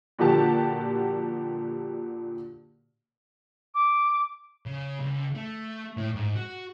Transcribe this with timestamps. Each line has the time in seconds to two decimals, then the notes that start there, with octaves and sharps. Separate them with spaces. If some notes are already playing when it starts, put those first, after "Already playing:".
0.19 A#2 D3 F3 F#4 G4 A5
3.74 D6
4.66 C#3
4.99 C#2
5.35 A3
5.97 A2
6.16 G#2
6.36 F#4